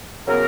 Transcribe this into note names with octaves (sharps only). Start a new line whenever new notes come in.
C#3 F#3 B3 A#4